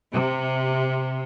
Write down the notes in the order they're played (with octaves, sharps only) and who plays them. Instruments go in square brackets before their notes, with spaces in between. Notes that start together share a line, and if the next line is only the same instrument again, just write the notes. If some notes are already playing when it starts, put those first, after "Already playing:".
[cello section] C3